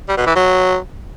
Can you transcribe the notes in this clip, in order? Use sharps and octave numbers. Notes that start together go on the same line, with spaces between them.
G3
B2
E3
F#3